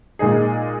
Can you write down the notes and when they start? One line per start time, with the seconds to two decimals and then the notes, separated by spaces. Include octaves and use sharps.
0.19 A#2 G#3 D#4 G#4